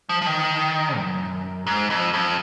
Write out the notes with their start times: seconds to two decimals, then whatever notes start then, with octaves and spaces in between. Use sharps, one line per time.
0.09 F3
0.22 F3
0.26 D#3
0.97 F#2
1.67 G#2
1.90 F2
2.14 F2